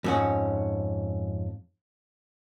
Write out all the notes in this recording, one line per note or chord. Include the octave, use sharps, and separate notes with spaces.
F2 G#2 C#4